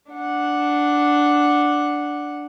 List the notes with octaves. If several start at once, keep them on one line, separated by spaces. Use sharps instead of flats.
D4 F#5